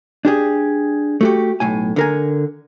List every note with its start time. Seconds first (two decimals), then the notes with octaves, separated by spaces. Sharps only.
0.25 D4 G4 G#4
1.21 A3 F#4 G4
1.60 B1 A2 G#5
1.96 D3 A#4 G#5